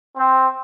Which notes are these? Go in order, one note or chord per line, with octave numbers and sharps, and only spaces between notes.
C4